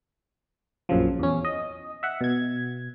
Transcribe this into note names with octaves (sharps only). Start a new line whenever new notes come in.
A#1 F#2 C#3 F3
E2 C#4
D#5
E5 F#5
B2 G#6